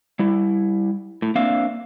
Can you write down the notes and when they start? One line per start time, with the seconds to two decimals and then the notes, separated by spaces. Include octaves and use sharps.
0.19 G3 E4
1.22 A2
1.35 A#3 C4 D4 E5 F5